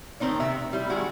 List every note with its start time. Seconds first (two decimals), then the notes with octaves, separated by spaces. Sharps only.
0.20 A2 D#3 C4 D#4 D5
0.40 C3 E5
0.73 G3 E4
0.90 D#3 G#3 E4 F#4